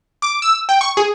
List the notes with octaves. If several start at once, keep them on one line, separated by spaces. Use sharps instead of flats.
D6
E6
G5
C#6
G#4